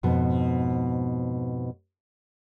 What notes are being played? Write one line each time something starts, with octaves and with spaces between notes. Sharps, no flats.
F2 G#2 B2 B3